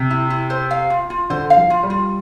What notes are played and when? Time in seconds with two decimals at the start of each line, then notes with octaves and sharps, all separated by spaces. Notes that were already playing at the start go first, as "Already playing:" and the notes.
Already playing: C3
0.10 E4
0.30 E4
0.50 C5
0.71 F5
0.90 F4
1.10 F4
1.30 D3 C5
1.50 F5
1.57 F3
1.70 F4
1.83 G3
1.90 F4